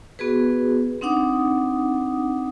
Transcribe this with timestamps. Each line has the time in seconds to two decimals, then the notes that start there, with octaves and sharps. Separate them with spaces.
0.19 B3 F#4 G#4 B4
1.01 C4 D4 D#4 F#5 D6 D#6